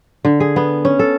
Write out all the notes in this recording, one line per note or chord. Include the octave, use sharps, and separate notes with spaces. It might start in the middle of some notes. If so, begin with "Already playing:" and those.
D3
G#4
B3
C#4
A4